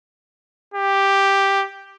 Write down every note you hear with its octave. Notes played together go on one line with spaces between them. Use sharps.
G4